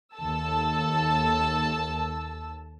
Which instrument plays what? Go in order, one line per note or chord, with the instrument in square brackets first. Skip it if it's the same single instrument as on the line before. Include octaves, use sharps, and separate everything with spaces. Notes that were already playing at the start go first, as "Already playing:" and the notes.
[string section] D#2 A4 A5 E6